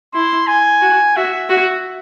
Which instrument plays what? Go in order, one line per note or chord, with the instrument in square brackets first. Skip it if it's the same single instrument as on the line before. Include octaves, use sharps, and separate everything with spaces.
[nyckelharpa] E4 [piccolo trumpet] C6
[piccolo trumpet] G#5
[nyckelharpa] F#4
[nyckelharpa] F#4 [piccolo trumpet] E5
[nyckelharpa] F#4